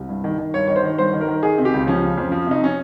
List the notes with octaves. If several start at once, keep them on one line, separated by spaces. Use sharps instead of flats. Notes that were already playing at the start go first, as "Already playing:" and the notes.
Already playing: C2
G2
D#3
D#3
G2 C#5
D#3 C#5
C5
D#3
G2 C5
D#3
A#4
D#3
D#3 G#4
C3
G4
C#2
F3 C#4
C#3
F2
F3
C3 D#4
C#4